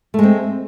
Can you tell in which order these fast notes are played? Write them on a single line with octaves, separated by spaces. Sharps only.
A3 G#3 C4